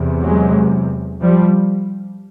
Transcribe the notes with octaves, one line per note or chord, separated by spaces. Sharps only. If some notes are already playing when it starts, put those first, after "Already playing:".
Already playing: E2 C3
F#3 G#3
F3 G3